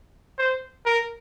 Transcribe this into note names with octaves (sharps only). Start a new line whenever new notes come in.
C5
A#4